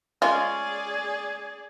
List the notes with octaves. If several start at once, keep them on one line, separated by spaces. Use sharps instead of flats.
G#3 C#4 F4 G#4 D5